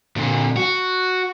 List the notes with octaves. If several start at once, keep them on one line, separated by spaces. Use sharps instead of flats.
A#2 D3
F#4